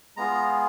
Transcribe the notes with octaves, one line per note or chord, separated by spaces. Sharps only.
G#3 B3 F4 G#4 A#5